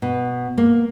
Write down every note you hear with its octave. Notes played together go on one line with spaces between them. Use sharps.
B2
A#3